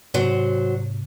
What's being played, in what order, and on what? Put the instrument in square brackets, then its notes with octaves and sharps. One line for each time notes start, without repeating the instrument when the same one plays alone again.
[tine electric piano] G#2 C3 [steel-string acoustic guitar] F#3 C5